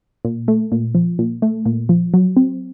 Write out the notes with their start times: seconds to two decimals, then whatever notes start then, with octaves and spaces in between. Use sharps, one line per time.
0.25 A#2
0.48 A3
0.72 A#2
0.95 F3
1.19 A#2
1.42 A3
1.66 A#2
1.89 F3
2.14 F#3
2.37 C4